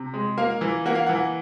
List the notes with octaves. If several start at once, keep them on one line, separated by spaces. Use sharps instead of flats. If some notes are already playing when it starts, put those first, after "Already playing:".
Already playing: C3
G#3
A#3 F5
E3
A#3 F#5
F5
E3 F#5